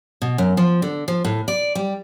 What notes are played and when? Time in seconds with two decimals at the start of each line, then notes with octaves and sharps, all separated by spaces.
0.22 B2
0.38 F#2
0.57 F3
0.82 D3
1.08 F3
1.25 A2
1.48 D5
1.75 G3